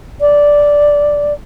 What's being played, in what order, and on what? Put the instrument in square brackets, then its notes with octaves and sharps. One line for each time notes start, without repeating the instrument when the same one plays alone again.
[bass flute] D5